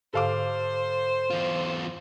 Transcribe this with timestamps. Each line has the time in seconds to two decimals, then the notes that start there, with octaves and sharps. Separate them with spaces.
0.14 G#2 D3 A4 C5 F5 D6
1.30 E2 F4